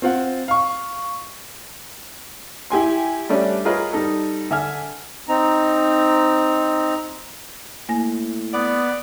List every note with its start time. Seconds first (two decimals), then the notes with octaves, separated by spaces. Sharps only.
0.02 C4 F4 F#5
0.48 F5 C#6
2.70 E4 G4 G#5 C6
3.29 G3 A3 C#4 D4
3.65 F4 G#4 A#4 B4 C#5 D#5
3.93 G3 D#4 A4
4.51 D3 E5 G#5 F6
5.29 C4 D#4 A#5
7.89 A2 A#3 G#5 A#6
8.53 B3 D5